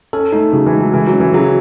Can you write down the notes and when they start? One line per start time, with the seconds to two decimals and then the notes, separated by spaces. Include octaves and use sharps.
0.13 C#4 A4
0.33 A3 D#4
0.53 C#3 F#3
0.66 E3
0.74 G#3
0.80 F#3
0.93 C#3 E3
1.07 F#3
1.13 C#4
1.20 E3
1.34 C#3 F#3